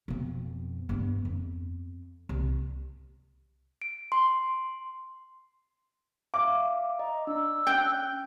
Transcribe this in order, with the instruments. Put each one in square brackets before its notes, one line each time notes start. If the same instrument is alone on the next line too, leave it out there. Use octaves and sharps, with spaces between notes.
[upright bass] F2 B2
G2 B3
F2
C2
[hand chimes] D7
C6
[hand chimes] E5 F5 [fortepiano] D6
[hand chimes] D#5 [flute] A#5
[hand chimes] D4 [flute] E6
[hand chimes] C#4 F#6 G6 [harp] G5